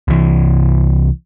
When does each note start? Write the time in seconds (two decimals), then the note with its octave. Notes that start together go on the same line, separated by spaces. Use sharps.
0.08 C2 E3